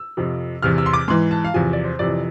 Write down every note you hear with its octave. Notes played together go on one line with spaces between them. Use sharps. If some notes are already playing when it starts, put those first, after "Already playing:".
Already playing: E6
F2 C3 F3
E2 C3 E3 F6
E6
C6
D6
G#2 E3 C6
A5
F5
E2 C3 F3 G#5
D5
C5
F2 C3 E3 D5